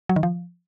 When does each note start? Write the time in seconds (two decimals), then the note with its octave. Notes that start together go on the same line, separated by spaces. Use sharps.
0.09 F#3
0.16 D#3
0.23 F3